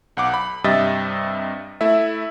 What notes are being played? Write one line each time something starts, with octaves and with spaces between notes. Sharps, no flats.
B1 F#5 D6
B5
G2 C3 G3 D#5 E5 A6
A3 E4 E5